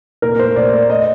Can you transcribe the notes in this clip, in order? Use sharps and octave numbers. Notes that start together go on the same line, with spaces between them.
A#2 A#4
A3 C5
A#2 D5
A3 D5
D#5